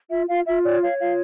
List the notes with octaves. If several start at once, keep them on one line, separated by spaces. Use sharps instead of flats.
F4 E5
F4 F5
F4 E5
C#5 D5
C#5 F5
F4 F5